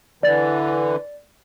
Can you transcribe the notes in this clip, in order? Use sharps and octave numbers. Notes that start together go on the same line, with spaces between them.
D3 E3 D5 A6